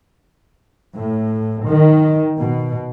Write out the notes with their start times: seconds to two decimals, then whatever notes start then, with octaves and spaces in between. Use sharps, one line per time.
0.95 A2
1.68 D#3
2.37 B2